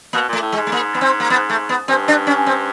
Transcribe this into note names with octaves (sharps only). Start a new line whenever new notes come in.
B2 A#3
A#2 A3
A2
G#3
G#2
A3
A#3
B3
C4
A#3
B3
A3
B3
G2 C4
D4
C#4
C4